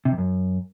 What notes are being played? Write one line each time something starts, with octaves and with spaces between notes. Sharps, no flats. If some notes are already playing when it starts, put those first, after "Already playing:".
C3
F2
F#2